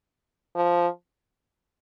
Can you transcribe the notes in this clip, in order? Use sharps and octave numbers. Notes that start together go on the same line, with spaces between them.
F3